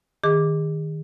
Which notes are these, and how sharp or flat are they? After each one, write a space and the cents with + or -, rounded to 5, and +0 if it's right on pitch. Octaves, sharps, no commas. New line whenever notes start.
D#3 +0 G#4 -35 D6 -5